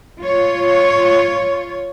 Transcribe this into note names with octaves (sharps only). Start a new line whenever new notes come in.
F4 C#5